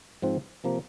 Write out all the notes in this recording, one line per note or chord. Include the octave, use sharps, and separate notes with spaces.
G#2 F3 C4
C3 F3 A#3